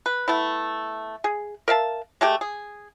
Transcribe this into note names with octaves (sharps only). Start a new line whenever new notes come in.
B4
A3 B3 E4
G#4
A#4 E5 F5 A5
G#3 A3 G4
G#4